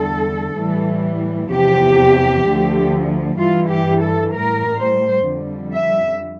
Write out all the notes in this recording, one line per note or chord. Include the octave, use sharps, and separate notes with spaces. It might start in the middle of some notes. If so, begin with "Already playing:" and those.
Already playing: E2 D3 G3 A4
A2 E3 G3
E2 C3 F3 G4
D2 D3 F3
G2 E3 G3 F4
G4
A4
A2 G3 A#4
C5
F2 D3 G3
E5